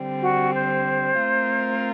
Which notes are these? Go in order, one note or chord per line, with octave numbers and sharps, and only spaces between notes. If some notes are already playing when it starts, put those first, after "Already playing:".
Already playing: D3 G3 C4
F#4
C5
A3 C4 F4 A#4